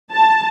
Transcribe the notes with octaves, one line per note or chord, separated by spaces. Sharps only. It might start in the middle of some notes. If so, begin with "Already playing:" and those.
A5